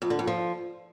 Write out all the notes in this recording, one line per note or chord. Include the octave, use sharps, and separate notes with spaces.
F2
D3
F2
F3